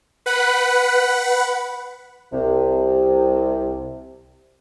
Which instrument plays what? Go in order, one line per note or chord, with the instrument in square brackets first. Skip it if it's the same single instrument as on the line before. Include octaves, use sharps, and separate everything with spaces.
[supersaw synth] B4 F#5 B5
[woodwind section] C2 C3